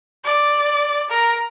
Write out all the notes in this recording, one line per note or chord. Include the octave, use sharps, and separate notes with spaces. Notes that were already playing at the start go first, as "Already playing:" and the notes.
D5
A#4